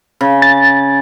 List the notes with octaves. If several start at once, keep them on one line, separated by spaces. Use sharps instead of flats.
C#3
A6